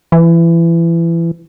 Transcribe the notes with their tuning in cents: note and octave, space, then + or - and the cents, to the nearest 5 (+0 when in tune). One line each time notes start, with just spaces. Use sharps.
E3 +25